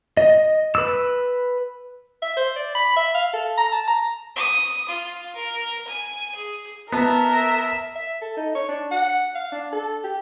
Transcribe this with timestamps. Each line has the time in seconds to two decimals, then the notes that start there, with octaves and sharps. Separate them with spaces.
0.17 D#5
0.75 B4 E6
2.22 E5
2.37 C5
2.56 D5
2.75 B5
2.96 E5
3.14 F5
3.34 A4
3.57 A#5
3.72 A5
3.88 A#5
4.35 D#6
4.89 F4
5.35 A#4
5.88 G#5
6.36 G#4
6.92 B3 A#4 E5 A5
7.33 E5
7.95 E5
8.21 A4
8.37 D#4
8.55 C#5
8.69 D4
8.91 F#5
9.35 F5
9.52 D4
9.73 A4
10.04 G4